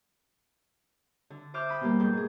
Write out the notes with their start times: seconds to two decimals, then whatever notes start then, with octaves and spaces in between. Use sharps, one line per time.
1.30 D3
1.54 C5 E5 D6 F6 G6
1.69 G5 B5 D#6
1.81 B2 G3 A#3
2.00 G#2 G6
2.13 G#2 G#4